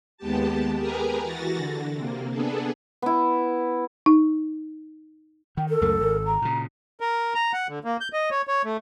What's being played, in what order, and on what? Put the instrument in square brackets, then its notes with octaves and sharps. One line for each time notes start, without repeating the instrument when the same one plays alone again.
[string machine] D#2 G#3 B3 G4 A5
G4 G#4 A#4 B4 G#5 A#5
E3 F#4 A6 A#6
D3
C3 A#3
B3 D4 G#4 A4
[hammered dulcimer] B3 E4
[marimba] D#4
[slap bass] D#3 [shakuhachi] G5
[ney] A4 [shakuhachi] A#4
[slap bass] C#2 F#2 A3
[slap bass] G#1 [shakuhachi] A#4
[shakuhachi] A#5
[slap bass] A#2 C#3
[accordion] A#4
A#5
F#5
D3
A#3
G6
D#5
C#5
C#5
A3